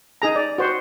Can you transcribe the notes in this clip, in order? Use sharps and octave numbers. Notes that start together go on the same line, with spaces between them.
D#4 G#4 A#5
D5
F#4 C5